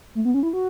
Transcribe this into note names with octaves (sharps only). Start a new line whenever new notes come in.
A3
B3
C#4
E4
F#4